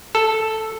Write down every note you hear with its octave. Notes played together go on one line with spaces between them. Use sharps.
A4